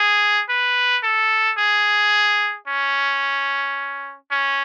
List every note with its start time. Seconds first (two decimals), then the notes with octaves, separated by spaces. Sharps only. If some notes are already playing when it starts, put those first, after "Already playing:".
Already playing: G#4
0.49 B4
1.03 A4
1.58 G#4
2.68 C#4
4.31 C#4